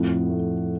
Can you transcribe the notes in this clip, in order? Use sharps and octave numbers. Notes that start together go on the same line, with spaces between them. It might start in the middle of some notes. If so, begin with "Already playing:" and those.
Already playing: F2 A2 F#5
A3